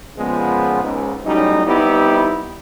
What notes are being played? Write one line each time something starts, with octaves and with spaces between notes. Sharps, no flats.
A#2 C#3 F3 G#3 B3
C#2 G#2
A2 F#3 G3 C#4 D#4
G3 B3 C4 D#4 E4 G4